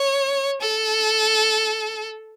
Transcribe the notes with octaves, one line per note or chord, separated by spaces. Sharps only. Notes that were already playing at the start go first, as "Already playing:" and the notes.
Already playing: C#5
A4